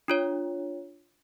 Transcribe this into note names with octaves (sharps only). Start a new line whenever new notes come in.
D4 F4 C#5